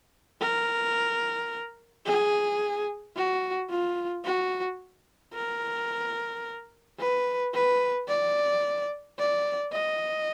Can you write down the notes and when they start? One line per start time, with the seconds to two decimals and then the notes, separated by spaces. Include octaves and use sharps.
0.41 A#4
2.06 G#4
3.16 F#4
3.70 F4
4.25 F#4
5.34 A#4
7.00 B4
7.54 B4
8.08 D5
9.19 D5
9.73 D#5